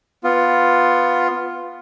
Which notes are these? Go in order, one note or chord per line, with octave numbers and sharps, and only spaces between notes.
B3 F4